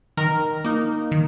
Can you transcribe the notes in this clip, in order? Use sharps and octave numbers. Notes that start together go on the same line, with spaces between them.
D#3 A#4
A#3 D#4
D#3